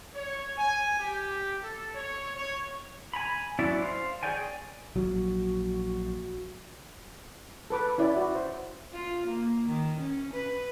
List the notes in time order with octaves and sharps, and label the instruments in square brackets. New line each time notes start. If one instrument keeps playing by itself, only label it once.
[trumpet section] C#5
G#5
G4
A4
C#5
C#5
[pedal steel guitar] G#5 A#5 B5
F#3 C#4 E4 D5 E5
C5 F5
G#4 C#5 D5 G5 G#5
[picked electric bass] A#1 F#3 [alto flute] F#4
[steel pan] A4 B4 D6
C#4 E4 D5
F#4
C5
[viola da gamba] F4
A#3
D#3
C#4
B4